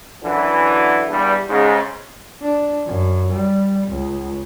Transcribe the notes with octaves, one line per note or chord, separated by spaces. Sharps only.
F#2 D3 E3
E2 G2 G3
G#2 C#3
D4
F#2
G3
C#2